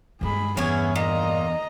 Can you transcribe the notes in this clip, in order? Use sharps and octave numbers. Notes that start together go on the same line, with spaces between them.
G2 G#3 G#4 B5
E2 G2 B3 C#4 E4 G#4
A#2 D#5 A#5